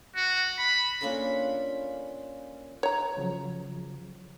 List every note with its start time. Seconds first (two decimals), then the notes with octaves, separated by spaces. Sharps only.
0.16 F#4
0.58 B5
1.01 A#3 C#4 D4 F4 A4 A#4
2.83 C#5 A#5
3.17 C#3 F3 F#3